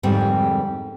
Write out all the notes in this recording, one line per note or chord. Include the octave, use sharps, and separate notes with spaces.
F2 G#2 D3 G3 A#3 C4